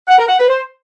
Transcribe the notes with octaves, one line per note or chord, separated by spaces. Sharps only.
F#5
A#4
F#5
B4
C5